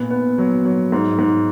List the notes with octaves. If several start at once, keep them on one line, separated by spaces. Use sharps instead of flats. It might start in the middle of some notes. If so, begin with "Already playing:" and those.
Already playing: A#2 B3
B3
F#3
F#3
G#2
G#2